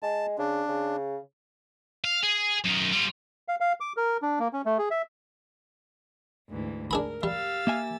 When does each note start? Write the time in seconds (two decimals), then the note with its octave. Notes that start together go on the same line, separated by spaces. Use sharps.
0.03 G#3 A5
0.38 C#3 D4
0.69 C#3
2.04 F5
2.23 G#4
2.64 F#2 D#3
2.92 G3 F4
3.48 F5
3.60 F5
3.80 D6
3.97 A#4
4.22 D4
4.39 A#3
4.53 C#4
4.66 A3
4.78 G#4
4.91 E5
6.49 D2 G#2 E3
6.91 D4 G#4 A#4 B5
7.23 G3 G4 F5 E6 A6
7.67 A#3 E5 G#5